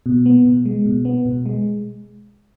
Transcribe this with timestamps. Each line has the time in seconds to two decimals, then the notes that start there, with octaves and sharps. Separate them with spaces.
0.06 B2
0.26 B3
0.46 B2
0.65 G#3
0.86 B2
1.05 B3
1.26 B2
1.46 G#3